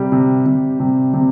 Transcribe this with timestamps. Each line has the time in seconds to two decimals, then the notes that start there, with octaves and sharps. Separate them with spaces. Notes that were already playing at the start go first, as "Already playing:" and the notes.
Already playing: C3 G3
0.12 C3
0.46 C3
0.80 C3
1.14 C3